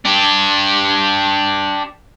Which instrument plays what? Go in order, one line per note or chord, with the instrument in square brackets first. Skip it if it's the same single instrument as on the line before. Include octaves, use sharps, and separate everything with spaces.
[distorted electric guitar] D4 G4